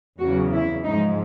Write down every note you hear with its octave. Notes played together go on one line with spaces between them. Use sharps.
E2 C#3 F#3 F#4
E4
G#2 F3 G#3 D#4